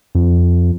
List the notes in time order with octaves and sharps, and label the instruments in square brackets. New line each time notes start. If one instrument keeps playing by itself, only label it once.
[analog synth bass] F2